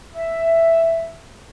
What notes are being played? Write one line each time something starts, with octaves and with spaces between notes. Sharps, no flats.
E5